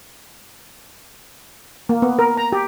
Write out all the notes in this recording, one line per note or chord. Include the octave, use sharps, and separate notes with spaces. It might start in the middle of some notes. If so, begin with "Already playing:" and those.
A#3
B3
A#4
A#5
G4